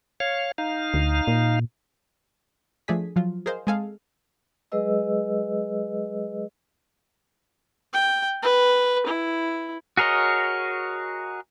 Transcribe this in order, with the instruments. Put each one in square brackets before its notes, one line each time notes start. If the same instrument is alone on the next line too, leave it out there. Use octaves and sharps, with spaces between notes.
[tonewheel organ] C#5 F5
D#4 F5
[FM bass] D2
A#2
[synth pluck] F3 A3 D4 G#4 G#5 B6
F3 F#3 F4
G#4 A#4 C5 D#5 F5
G#3 C4 G#4 A4 F5
[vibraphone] F#3 G#3 G#4 B4 D#5 E6
[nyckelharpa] G5
B4
E4
[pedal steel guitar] F#4 G#4 A#4 C#5 D#5